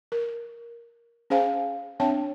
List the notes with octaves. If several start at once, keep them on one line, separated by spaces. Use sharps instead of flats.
A#4
C#4 G#4 C5 F5 G#5
C4 D4 C#5 E5 G5 A5